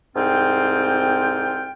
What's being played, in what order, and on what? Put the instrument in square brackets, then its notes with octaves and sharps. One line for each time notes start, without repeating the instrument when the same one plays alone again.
[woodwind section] C2 G#2 C4 F4 G5